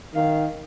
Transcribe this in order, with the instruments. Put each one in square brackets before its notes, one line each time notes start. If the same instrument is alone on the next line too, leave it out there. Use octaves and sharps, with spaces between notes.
[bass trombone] D#3 [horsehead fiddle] F5